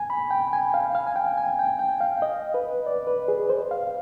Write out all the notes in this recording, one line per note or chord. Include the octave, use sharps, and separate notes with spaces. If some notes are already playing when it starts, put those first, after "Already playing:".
Already playing: G#5
B5
G5
G#5
F5
F5
G#5
G5
G#5
G5
G5
F5
D#5
B4
D5
B4
G#4
C5
F5